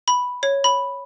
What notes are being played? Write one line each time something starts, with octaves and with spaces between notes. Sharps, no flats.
B5
C#5
B5